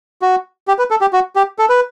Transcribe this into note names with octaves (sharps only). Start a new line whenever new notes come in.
F#4
G4
B4
A4
G4
F#4
G4
A4
B4